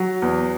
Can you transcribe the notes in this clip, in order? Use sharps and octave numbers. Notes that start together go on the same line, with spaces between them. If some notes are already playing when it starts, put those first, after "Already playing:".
Already playing: F#3
E2